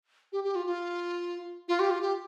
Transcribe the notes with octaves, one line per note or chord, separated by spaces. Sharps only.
G4
G4
F4
F4
F4
G4
F4
G4